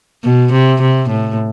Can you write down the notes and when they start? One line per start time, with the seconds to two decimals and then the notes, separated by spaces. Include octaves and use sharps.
0.24 B2
0.52 C3
0.81 C3
1.09 A2